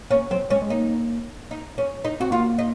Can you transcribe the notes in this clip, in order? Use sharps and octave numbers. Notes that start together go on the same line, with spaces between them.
A#3 C#4
F#3 C4
G#3 C#4
G#3
A#3 D#4
D#4
C#4
D#4
C4 F#4
A#3 F4
D#4